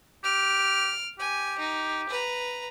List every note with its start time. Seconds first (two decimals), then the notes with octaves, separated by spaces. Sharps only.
0.24 G4 F6 D7
1.20 G4 G#5
1.59 D#4
2.09 B4 A#5